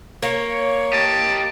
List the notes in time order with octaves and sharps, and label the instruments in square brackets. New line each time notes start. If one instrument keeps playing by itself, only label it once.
[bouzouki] A#3 [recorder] C#5
[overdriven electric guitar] G4 D#5 [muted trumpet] A5